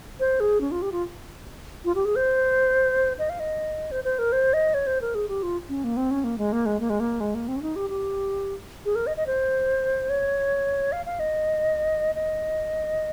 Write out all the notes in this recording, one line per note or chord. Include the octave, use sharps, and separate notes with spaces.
C5
G#4
C#4
F4
G4
F4
F4
G4
G#4
C5
D#5
F5
D#5
C5
C5
A#4
C5
D#5
C#5
C5
A#4
G#4
G4
F4
C#4
A#3
C4
C#4
A#3
G#3
A#3
G#3
A#3
G#3
A#3
G#3
A#3
C4
C#4
D#4
G4
G4
G#4
A#4
D#5
D#5
C5
C#5
F5
F5
D#5
D#5